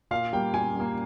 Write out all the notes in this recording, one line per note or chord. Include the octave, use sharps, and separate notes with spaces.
A#2 F5
G3 A#3 G5
A#2 G#5
G3 A#3